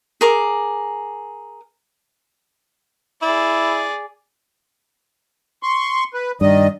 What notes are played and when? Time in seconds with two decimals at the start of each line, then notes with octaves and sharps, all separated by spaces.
0.21 G#4 A#4 D6
3.22 E4 G#4 D5
5.63 C6 C#6
6.14 B4
6.41 G2 D#3 D5 D#5